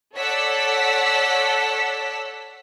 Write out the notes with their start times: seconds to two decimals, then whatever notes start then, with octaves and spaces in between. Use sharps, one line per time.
0.15 A4 C#5 D5 F#5 E6 B6